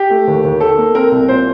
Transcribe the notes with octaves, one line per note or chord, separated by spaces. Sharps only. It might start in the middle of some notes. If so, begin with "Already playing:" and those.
Already playing: G4
A3
D#2
D#2
D#3 A4
A#3
C4 A#4
C2
A#2 C5